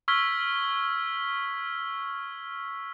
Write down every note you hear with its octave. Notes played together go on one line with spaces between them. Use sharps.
C#6 E6 F6 G#6 B6 G7